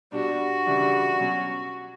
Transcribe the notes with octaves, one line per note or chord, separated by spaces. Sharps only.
B2 G3 D4 F#4
C#3 E3 G3 D4
B2 F#3 C#4